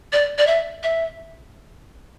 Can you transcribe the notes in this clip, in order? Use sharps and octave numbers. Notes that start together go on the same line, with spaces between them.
D5
D5
E5
E5